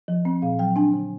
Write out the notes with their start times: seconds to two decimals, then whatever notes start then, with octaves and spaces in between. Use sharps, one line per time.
0.08 F3
0.25 C4
0.42 A#2 F5
0.59 F#3 G5
0.76 D4 G#5
0.94 D3